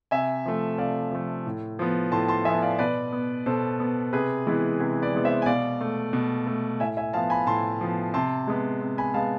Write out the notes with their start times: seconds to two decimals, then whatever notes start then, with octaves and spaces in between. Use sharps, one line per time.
0.11 C3 E5 G#5
0.46 F3 A3
0.78 C3 D5 F5
1.11 F3 A3
1.46 A2
1.79 F3 B3
2.12 A2 A5 C6
2.28 A5 C6
2.45 F3 B3 E5 G#5
2.62 D5 F5
2.79 B2 B4 D5
3.13 B3
3.46 B2 A4 C5
3.80 B3
4.13 C3 G#4 B4
4.47 E3 G#3 B3
4.80 C3 G#4 B4
5.02 B4 D5
5.13 E3 G#3 B3
5.24 C5 E5
5.42 G#5
5.46 B2 D5 F5
5.81 A3
6.13 B2
6.47 A3
6.80 A2 E5 G#5
6.97 E5 G#5
7.13 F3 F5 A5
7.17 B3
7.30 G#5 B5
7.47 A2 A5 C6
7.81 F3 B3
8.14 C3 A5 C6
8.47 G#3 B3
8.81 C3
8.98 G#5 B5
9.14 G#3 F5 A5
9.17 B3